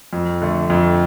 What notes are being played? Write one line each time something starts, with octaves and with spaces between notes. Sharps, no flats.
F2
D3 A3
F2